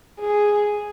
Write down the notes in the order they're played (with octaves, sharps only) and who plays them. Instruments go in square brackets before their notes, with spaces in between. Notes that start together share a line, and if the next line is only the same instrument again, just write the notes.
[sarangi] G#4